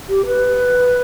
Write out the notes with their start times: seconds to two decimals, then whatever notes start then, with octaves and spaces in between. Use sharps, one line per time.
0.09 G4
0.26 B4